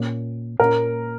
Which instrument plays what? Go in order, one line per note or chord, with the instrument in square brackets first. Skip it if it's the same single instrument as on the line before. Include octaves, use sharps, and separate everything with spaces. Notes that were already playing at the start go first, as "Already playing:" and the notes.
Already playing: [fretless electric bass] A#2 A#3 C#4
[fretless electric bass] A#2 A#3 C#4 [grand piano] A#4